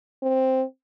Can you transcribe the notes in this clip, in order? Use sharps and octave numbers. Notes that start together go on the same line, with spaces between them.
C4